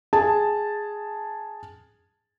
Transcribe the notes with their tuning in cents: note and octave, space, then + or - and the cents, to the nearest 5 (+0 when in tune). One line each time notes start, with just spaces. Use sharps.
G#4 +0 A5 +0